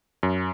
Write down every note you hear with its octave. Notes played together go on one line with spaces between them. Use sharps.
F#2